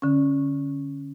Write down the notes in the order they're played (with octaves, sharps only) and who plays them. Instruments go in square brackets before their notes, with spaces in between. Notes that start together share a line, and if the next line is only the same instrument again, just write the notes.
[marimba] D3 C#4